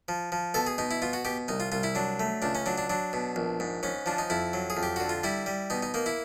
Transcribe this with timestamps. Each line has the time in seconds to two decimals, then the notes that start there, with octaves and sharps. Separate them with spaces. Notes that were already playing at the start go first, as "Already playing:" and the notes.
0.08 F3
0.32 F3
0.54 B2 A4
0.67 G#4
0.78 B2 D#4
0.91 E4
1.02 B2 F4
1.13 F#4
1.25 B2 G4
1.48 C2 D#4
1.60 F4
1.72 C2 F4
1.83 E4
1.95 F#3 D4
2.20 A3
2.42 C#2 D4
2.55 C#4
2.66 F#3 D4
2.78 D4
2.90 F#3 D4
3.13 B2
3.36 A#1
3.60 G#2
3.83 G#2 C#4
4.06 F3 D4
4.18 D#4
4.30 F2 E4
4.53 F#3
4.70 G#4
4.77 F2
4.83 G4
4.96 D3 F#4
5.09 F4
5.24 G3 E4
5.46 G3
5.70 B2 D#4
5.82 D#4
5.94 A#3 D#4
6.06 E4